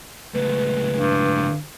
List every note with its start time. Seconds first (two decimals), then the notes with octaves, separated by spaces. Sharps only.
0.34 C#2 A2 B4
0.95 G2